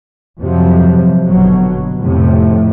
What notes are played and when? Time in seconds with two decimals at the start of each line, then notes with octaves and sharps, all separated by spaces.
0.40 F2 G#2 C3 F3 F#3
1.27 G1 B2 F#3
2.01 F2 A2 C3